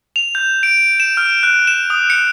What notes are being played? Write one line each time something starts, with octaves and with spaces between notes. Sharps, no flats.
F7
G6
D7
D7
E7
F6
F#6
E7
D#6
C#7